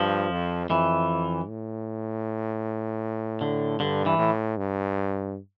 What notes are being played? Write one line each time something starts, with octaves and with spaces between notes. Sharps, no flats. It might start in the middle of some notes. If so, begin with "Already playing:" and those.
Already playing: G2 F3
F2
F2 E3
A2
D3
G2 D3
E3
A2
G2